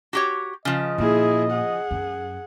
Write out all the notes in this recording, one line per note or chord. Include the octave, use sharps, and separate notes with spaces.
F#4 G4 C#5
C#3 F3 D#5
A#2 E4 G#4
G#4 F#5
F#2